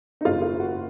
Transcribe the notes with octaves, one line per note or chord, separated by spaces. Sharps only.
D#4
F#1 F#2 D#3 F4
F4
F#4